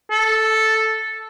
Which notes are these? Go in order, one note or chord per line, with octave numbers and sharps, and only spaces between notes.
A4